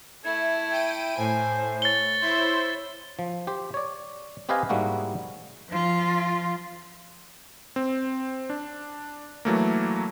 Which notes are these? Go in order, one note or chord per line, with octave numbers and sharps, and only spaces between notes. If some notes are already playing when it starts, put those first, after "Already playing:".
A3 E4 G#6
G5 D7 D#7
A2 C5 G#5
C#5 A6 G7
E4 C5 E5 C6
F3
G4 C5
C#5 D5
C4 G4 B4 D#5 F5 G#5
G#2 G3 G#3 A#3 E4 F#4
F3 F4
C4
D4
E3 F#3 A3 A#3